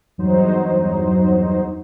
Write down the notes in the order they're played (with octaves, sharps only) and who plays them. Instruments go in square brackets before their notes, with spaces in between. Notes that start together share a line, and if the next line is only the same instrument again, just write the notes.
[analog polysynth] E2 G2 F#3 D#4 C5